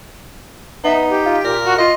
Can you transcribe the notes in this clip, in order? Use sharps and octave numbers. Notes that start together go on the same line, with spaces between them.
B3 D#4 E5
G4
F4
A#2 A#4
F#4
F4 D#5